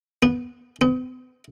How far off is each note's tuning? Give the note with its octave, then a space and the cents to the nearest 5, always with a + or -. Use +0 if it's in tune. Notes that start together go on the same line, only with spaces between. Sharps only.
B3 -10
B3 +45